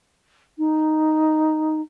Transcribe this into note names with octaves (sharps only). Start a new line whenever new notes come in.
D#4